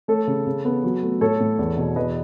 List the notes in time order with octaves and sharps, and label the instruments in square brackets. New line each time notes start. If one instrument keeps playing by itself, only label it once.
[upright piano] A3 A4 C#5
C#3
C#3
B3
F#3
A3
A2 A4 C#5
A2
E2
B2
E2 B4 D#5